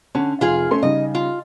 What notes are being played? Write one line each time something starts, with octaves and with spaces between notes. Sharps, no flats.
D3 C#4
F1 F4 G#4 F5
A3 C#4 C6
C#3 G3 D#4 D#5
F4